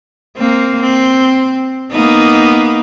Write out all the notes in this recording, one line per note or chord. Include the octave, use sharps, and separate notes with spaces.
A#3 C4
C4
A#3 B3 D#4